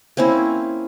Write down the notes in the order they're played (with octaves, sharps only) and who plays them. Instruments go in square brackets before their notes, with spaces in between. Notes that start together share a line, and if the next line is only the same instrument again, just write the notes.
[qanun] A#3 C4 C#4 E4